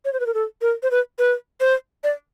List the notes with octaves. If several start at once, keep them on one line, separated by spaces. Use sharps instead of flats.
C#5
C5
B4
A#4
A4
A#4
C5
B4
B4
C5
D5